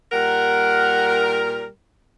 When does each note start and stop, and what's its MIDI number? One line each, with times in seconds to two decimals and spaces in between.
0.12 1.67 46
0.12 1.67 55
0.12 1.67 70
0.12 1.45 78